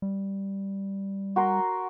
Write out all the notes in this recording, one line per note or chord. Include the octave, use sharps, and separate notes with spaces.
G3
F#4 A#4 C6